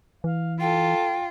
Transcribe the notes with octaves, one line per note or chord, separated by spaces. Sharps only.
E3 F5
F4 A4 G5